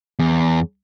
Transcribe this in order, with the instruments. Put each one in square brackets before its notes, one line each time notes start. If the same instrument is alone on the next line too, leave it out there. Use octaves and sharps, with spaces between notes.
[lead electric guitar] E2